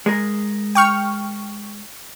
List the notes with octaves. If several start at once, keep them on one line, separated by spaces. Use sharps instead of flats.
G#3 G#4 A#4
G5 C#6 F6